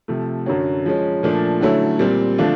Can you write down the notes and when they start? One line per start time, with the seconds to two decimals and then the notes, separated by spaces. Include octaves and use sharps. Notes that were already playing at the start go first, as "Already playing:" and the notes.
0.08 C3 F3 A3
0.46 F#2 D3 F#3
0.86 F3 G#3 C#4
1.23 A#2 F3 A3 D4
1.61 D3 F#3 A3 C#4 E4
1.99 A#2 G3 C4
2.38 D3 F3 A3 D4 F4